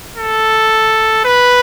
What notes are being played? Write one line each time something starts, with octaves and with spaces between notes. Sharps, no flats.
A4
B4